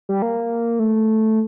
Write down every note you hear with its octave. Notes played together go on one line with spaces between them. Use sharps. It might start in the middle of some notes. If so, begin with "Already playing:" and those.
G3
A#3
A3